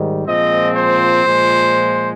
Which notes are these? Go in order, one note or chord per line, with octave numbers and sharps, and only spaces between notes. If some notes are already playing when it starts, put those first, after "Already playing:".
Already playing: G#2 D#3 G3
A#2 F3 G#3 C4 D#5
C5
A#2 F3 G#3